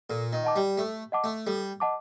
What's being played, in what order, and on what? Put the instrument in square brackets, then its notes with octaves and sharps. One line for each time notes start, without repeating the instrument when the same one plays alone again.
[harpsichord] A#2 [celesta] A4
[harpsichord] D#3
[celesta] D#5 F#5 A5 D6
[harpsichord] G3
[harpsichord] A3 [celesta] A4
[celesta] D#5 F#5 A5 D6
[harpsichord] A3
[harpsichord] G3 [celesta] A4
[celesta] D#5 F#5 A5 D6